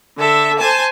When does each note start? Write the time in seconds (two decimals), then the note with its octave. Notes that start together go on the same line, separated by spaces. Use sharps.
0.17 D3 A4 E5
0.58 C5 G#5 A5